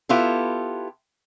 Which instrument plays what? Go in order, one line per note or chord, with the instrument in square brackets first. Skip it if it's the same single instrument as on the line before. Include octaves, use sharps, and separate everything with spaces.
[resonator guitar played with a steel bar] B3 E4 F4 G4 A4